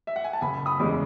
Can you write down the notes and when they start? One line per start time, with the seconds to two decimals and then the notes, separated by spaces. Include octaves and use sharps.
0.07 E5
0.16 F#5
0.24 G#5
0.33 A5
0.41 F#1 G#5 B5
0.66 B5 D#6
0.79 E2 C#3 G#3